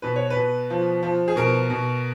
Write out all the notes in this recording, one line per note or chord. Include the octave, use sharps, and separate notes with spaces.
B2 B4
C#5
B4
B2
F3
F3
G#4
B2 A#4
B2